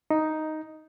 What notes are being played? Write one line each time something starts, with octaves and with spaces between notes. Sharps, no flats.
D#4